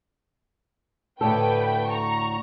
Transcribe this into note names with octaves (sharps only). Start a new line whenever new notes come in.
D2 A2 A3 A4 B4 G5
A#5 C#6